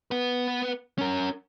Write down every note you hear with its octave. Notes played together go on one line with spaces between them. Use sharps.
B3 B4
C#4 A#4